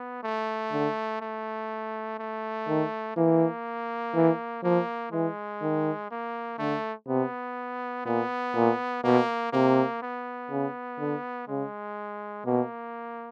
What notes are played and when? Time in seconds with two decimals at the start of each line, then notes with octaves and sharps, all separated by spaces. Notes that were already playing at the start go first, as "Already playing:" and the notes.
Already playing: B3
0.23 A3
0.72 D3
1.21 A3
2.19 A3
2.68 D#3
3.17 E3 A#3
4.15 E3
4.64 F3 A#3
5.12 E3 G#3
5.61 D#3
6.11 A#3
6.59 D3 A3
7.08 C3 B3
8.06 A#2 B3
8.55 A#2
9.04 B2 A#3
9.52 C3 A#3
10.02 B3
10.51 C#3
10.99 D3
11.48 C#3 G#3
12.46 B2 A#3